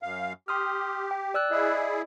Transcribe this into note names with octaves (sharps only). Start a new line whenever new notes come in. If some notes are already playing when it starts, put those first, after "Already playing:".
F#2 F5
G4 C6 D#6 F6
G5
D5 E6 F#6
E4 G#4 D5 D#5